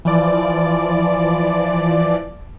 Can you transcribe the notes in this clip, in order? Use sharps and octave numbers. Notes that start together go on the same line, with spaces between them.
E3 F3 D5